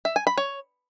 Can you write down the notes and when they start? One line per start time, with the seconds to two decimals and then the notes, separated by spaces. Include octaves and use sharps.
0.05 E5
0.16 G#5
0.27 B5
0.38 C#5